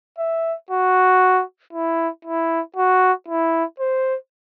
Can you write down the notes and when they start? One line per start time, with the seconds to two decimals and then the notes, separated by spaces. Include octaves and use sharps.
0.19 E5
0.71 F#4
1.73 E4
2.25 E4
2.76 F#4
3.28 E4
3.80 C5